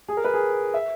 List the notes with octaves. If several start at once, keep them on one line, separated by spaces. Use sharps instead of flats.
G#4
A#4
B4
G#4
E5